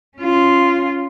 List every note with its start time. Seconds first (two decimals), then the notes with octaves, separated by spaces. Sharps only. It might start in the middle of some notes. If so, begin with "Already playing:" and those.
0.17 C#4 F4